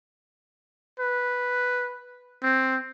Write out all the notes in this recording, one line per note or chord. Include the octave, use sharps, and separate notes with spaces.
B4
C4